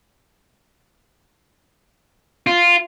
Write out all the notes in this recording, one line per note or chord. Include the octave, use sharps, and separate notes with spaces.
F4